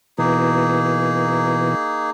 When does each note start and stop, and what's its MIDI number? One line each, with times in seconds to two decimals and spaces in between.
0.18 1.75 47
0.18 1.75 52
0.18 2.10 58
0.18 2.10 63
0.18 2.10 68